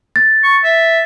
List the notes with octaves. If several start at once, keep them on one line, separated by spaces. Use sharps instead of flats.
A6
C#6
E5